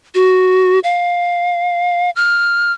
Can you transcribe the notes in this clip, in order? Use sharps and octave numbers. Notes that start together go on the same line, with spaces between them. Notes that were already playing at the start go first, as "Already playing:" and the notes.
F#4
F5
F6